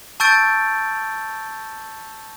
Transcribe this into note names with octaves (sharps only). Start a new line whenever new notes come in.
A5 C#6 E6 G6 A6 D7